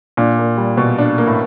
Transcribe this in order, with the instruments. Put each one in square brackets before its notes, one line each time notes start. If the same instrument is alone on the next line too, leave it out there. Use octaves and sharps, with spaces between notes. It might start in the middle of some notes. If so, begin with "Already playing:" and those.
[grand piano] A#2 [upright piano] D4
[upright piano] A#3
G3
B2
D4
A#3
[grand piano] A2